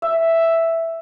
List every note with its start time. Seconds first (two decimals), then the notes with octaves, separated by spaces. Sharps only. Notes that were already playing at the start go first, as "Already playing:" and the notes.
0.02 E5